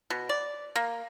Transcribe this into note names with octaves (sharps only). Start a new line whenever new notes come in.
B2
D5
A#3